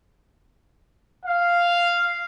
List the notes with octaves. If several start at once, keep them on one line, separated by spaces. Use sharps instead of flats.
F5